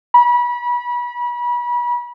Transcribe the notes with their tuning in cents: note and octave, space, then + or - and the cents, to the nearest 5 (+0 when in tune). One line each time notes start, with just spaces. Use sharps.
B5 -35